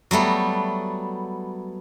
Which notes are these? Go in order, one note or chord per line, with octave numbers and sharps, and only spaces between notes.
F#3 G3 A3 B3